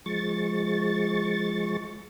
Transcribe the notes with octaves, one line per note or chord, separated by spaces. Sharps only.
F3 G#3 C#6 A6